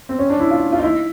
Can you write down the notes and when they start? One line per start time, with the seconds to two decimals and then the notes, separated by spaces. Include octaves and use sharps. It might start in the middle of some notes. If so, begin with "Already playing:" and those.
0.09 C4
0.19 C#4
0.30 D4
0.40 E4
0.51 F4
0.72 F4
0.78 D#4
0.83 E4